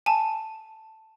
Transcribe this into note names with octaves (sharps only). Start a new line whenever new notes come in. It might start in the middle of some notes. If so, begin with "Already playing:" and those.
G#5 A5